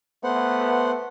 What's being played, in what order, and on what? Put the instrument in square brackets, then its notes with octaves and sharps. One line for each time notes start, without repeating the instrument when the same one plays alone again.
[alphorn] A3 [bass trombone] B3 [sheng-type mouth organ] C5 F#5